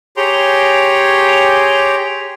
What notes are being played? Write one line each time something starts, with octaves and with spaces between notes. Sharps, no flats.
G4 G#4 C#5 G5 A#5 C6